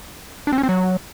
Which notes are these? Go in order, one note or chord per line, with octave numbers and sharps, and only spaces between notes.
D4
C4
C#4
C4
F#3